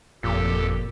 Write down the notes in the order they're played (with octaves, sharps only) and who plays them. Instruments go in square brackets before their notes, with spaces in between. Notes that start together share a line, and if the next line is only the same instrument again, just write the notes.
[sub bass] G1 [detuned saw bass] F2 [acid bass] A#2 [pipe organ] G4 A4